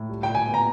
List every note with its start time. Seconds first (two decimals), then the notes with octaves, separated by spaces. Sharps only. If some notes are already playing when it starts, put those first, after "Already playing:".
Already playing: A2
0.09 G3
0.23 A#2 G5
0.35 G#5
0.47 B3
0.54 A#5